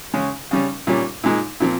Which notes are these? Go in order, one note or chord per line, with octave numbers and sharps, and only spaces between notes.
C#3 G#3 C#4
C#3 G3 C#4
A#2 G3 C#4
A#2 G#3 D#4
A#2 F3 C4